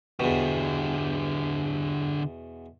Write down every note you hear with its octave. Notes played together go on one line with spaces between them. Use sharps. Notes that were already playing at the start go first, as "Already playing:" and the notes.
E2 B2 D3 G4